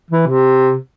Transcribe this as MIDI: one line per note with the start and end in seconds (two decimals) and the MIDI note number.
0.11 0.25 52
0.27 0.75 48